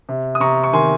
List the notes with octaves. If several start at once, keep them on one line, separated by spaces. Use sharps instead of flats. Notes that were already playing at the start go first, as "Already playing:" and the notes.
C3
D#6
C3 A#5 C#6
C#6
D#3 G#5 C6